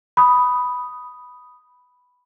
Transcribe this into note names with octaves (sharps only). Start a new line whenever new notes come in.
B5 D#6